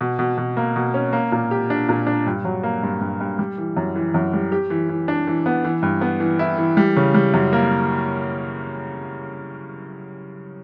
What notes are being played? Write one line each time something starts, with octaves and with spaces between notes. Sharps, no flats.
B2
B2
B2
A#3
B2
C#4
A#3
A#2
G4
D4
A#2
D4
G2
F#3
A#3
G2
G2
G2
G3
E3
F#2
E3
F#2
G3
G4
E3
E3
D4
E3
B3
E3
G2
B3
E3
E4
E3
G3
C#3
G3
F#2
A#3